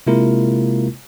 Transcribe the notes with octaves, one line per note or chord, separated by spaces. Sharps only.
C3 G#3 A#3 E4 F4 A#4